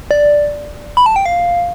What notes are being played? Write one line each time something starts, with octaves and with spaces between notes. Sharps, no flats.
D5
B5
A5
G5
F5